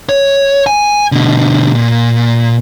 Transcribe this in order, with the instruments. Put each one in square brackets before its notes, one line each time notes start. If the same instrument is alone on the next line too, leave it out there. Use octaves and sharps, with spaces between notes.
[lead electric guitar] C#5
G#5
B2 D3
A#2